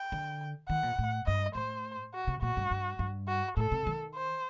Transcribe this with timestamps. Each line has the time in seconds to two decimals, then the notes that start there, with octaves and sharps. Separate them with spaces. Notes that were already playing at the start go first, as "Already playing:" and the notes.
Already playing: G5
0.12 D3
0.69 D#3 F#5
0.83 A#2
0.99 A2
1.26 G2 D#5
1.55 A2 C5
2.14 F#4
2.27 C3
2.42 A#2 F#4
2.57 G2
2.71 G2
2.99 G2
3.28 F#4
3.57 A2 A4
3.72 C3
3.87 D#3
4.15 C5